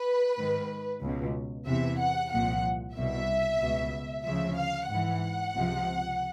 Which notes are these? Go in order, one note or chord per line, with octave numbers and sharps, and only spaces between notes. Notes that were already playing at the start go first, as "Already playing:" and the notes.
Already playing: B4
G#2 D#3
C#2 B2
E2 C3 E3 E5
F#5
C2 A#2 F3 F#5
C2 B2 E5
C#2 B2
D2 C#3 F3 E5
F5
G#2 E3 F#5
C#2 C3 F3